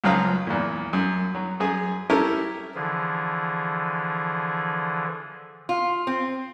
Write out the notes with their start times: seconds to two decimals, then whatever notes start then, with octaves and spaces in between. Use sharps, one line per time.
0.04 C#2 F#2 F3 F#3 F5 D#6
0.47 E2 A#2
0.93 F#2
1.35 F#3
1.60 F#2 G#4 G#5
2.10 C#4 E4 G4 A4 A#4
2.75 D3 E3 F3 G#4
5.69 F4
6.07 C4